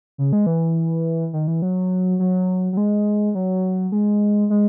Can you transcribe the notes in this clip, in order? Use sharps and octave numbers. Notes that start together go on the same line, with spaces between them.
C#3
G#3
E3
D#3
E3
F#3
F#3
F#3
G#3
F#3
G#3
G#3